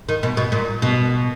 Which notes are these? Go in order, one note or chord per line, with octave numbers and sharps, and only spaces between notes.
D#3
B2
B2
A#2
B2